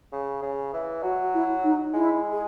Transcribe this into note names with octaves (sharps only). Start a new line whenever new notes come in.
C#3
C#3
E3
F#3 F#4
E4
D#4
G#3 E4
G#4